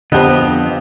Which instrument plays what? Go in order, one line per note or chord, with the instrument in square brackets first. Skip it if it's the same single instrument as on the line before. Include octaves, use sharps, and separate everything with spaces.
[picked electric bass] F2 D3 [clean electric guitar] B3 [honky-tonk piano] C4 G4 D#5